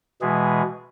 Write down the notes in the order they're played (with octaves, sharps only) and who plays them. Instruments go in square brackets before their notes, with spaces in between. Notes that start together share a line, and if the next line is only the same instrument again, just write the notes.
[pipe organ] B2 E3 G#3 G#4